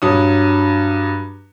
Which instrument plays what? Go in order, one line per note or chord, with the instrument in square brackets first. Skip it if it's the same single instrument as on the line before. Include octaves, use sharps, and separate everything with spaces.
[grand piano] G2 F#3 D#6